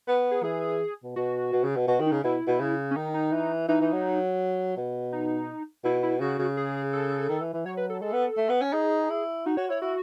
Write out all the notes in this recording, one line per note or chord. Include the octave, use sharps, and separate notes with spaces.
B3 B4
G#4
E3 G#4
B2
B2 F#4
B2
C#3
B2
B2 F#4
D#3
D#4
C#3
B2 E4
B2
C#3
C#4
D#3 D#4
D#4
E3
E3 D#4
E3
F#3
B2
D#4
B2 E4
E4
C#3 F#4
C#3
G#4
A4
D#3
E3
E3
F#3 C#5
B4
A4
G#3 A4
B3
A3
B3
C#4
D#4 G#4
E4
D#4 F#4
F#4 C#5
E4 C#5
E4 F#4